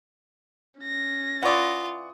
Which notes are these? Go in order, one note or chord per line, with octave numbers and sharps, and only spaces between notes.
C#4 A#6
E3 F4 D5 F#5 C#6 D#6